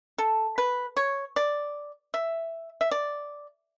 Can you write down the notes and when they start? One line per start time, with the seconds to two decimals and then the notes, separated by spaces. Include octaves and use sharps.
0.18 A4
0.58 B4
0.97 C#5
1.36 D5
2.14 E5
2.81 E5
2.91 D5